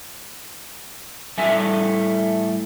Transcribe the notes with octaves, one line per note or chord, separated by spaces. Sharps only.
A2 G3 A3 E5 G#5